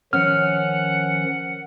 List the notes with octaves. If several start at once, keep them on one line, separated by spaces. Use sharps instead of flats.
D#3 F3 C#4 F#5 F6